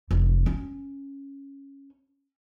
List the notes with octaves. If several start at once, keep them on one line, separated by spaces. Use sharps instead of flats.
F1 E3
C#4